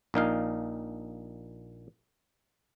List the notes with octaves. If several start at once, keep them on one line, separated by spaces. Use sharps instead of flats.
A#1 A#2 D#4 F5